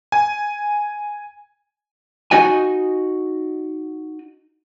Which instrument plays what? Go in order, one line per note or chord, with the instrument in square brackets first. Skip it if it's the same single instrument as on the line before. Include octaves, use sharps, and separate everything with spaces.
[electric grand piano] G#5
[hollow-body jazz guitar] D#4 F#4 D#5 G#5